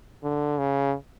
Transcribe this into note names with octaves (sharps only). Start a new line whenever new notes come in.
D3
C#3